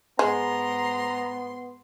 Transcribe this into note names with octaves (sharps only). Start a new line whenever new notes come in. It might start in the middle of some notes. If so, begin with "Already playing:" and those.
G#2 G#3 B3 A#5 C6